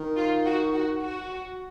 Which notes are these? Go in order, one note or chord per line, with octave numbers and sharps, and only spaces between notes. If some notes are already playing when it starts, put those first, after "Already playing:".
Already playing: D#3
F4
F#4
F#4
F#4